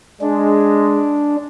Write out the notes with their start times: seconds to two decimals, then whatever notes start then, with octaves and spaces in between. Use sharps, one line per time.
0.21 G#3 D4